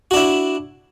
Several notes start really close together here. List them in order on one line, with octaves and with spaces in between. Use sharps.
F#4 D4 E4